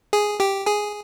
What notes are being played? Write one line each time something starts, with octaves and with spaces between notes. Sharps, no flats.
G#4 G#5
G4 G5
G#4 G#5